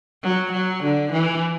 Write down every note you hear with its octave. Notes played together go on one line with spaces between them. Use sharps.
F#3
F#3
D3
E3